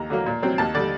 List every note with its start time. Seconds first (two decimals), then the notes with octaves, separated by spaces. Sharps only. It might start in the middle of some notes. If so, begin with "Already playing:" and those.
Already playing: D#2 A#5
0.10 D3 F#3 A#3
0.26 A#2
0.42 F#3 C4
0.58 D#2 A5
0.75 D3 G3 D5